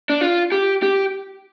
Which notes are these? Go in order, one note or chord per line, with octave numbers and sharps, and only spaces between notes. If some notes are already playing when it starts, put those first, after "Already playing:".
D4
F4
G4
G4